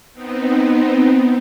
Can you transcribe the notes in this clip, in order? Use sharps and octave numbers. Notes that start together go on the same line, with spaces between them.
B3 C4 D#4